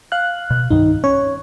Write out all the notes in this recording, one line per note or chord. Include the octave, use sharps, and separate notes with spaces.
F5 F#6
B2
C2 G2 D#3 D#4
C#4 C#5